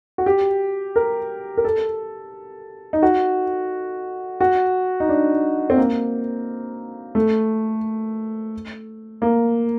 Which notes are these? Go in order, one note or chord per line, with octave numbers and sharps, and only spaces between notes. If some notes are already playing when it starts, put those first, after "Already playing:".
F#4
G4
A#4
A#4
A4
D#4
F#4
F#4
D#4
D4
C4
A#3
A3
A#3